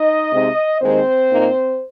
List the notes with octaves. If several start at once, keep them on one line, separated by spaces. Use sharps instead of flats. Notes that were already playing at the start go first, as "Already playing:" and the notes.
Already playing: D#4 D#5
C3 G#3 C4 D#4
D#2 D#3 G#3 C4 D#4 C5
A#2 A#3 D#4